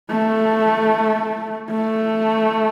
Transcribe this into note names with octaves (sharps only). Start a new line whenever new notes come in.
A3
A3